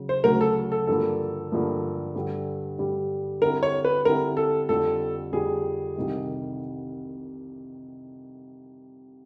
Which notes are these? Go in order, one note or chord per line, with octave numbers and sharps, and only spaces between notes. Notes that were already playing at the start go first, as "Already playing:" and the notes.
Already playing: C#3 F#3
C5
D2 C#3 F#3 A#4
A4
A4
G2 D3 F3 A#3 A4
G2 D3 F3 A#3
G2 D3 G3
G2 D3 G3
D3 G3 C4 E4 A#4
C#5
B4
D3 G3 C4 E4 A#4
A4
F2 D3 G3 A4
F2 D3 G3 G#4
C2 C3 D#3 G3